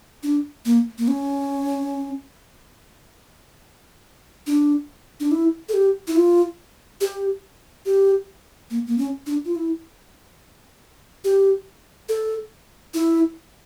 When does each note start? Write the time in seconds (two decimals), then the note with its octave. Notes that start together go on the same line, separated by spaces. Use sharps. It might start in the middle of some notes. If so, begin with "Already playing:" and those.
0.23 D4
0.65 A#3
0.98 A#3
1.08 C#4
4.47 D4
5.20 D4
5.31 E4
5.69 A4
5.74 G4
6.07 E4
6.16 F4
7.01 G4
7.86 G4
8.70 A#3
8.87 A#3
8.98 C#4
9.26 D4
9.45 F4
9.55 E4
11.24 G4
12.09 A4
12.94 E4